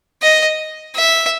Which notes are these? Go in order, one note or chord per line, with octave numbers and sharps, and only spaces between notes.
D#5
E5